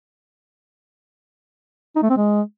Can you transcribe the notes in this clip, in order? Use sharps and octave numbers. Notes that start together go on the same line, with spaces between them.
D#4
A3
C4
G#3